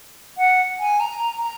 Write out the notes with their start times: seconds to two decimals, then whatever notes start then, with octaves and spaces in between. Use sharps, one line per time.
0.38 F#5
0.80 G#5
1.00 A#5
1.42 A#5